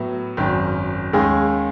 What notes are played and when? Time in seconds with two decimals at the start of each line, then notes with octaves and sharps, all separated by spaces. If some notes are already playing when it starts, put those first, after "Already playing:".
Already playing: A2 F#3 B3
0.37 G#1 F#2 D#3
1.13 D#2 D#3 G#3 C#4 G#4